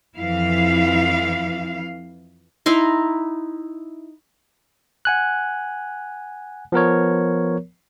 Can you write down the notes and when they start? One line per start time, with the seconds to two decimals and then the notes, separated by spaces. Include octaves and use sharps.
0.16 F2 E3 E4 F5
2.66 D#4 E4 A#5 C6
5.05 F#5 G#5 F#6
6.72 F3 B3 A#4 C#5